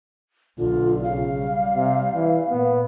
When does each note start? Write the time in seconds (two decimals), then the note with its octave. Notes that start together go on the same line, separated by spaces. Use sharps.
0.59 B1 D3 F4
1.04 C#3 F5
1.38 G3
1.76 C3
2.15 E3
2.50 A#2 B3